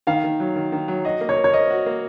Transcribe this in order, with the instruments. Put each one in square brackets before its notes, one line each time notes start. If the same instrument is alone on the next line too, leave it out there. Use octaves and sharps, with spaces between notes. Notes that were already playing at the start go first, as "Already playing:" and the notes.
[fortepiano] D#3 [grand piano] F5
[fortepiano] D#3
F#3
D#3
D#3
F#3
[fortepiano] F#4 [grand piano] D#5
[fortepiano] A#3
[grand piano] C#5
[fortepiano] A#4
[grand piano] C#5
[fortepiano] A#4 [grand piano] D#5
[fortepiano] F#4
A#3